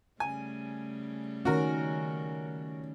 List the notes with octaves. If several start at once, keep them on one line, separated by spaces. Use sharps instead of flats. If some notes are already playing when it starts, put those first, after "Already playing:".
C#3 G3 A3 G#5
D#3 C#4 F#4 A#4